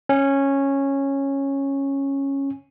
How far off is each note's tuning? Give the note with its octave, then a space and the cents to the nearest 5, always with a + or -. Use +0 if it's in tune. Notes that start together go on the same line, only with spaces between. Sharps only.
C#4 -10